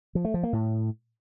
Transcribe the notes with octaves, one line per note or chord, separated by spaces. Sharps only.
F3
A3
F3
A#3
A2